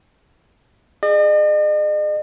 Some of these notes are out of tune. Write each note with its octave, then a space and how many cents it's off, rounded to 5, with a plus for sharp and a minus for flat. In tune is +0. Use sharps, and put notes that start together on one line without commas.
G#4 +0 D#5 -45